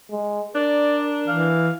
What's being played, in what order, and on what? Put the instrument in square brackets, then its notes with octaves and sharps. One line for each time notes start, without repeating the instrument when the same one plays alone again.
[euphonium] G#3
[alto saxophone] D4 [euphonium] A#4 [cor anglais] D5
[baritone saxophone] E3 [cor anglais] F5